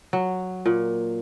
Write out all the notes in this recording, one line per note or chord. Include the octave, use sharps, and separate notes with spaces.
F#3
A#2